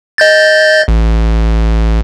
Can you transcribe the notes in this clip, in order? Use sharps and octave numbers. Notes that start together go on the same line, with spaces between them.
D#5 G6 A6
A1